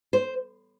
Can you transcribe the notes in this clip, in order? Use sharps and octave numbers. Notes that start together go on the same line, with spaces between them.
C5